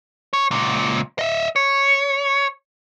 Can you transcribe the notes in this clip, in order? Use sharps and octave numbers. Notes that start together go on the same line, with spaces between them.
C#5
C#2 A#2
D#5 E5
C#5